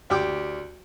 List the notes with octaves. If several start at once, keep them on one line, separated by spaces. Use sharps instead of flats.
D2 G4 G5 D6